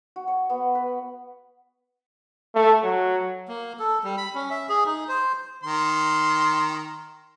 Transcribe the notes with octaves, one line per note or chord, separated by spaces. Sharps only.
F#4
C#5
B3
B4
A3
F#3
A#3
A4
G3
B5
C#4
E5
G#4
D#4
C5
D#3 C6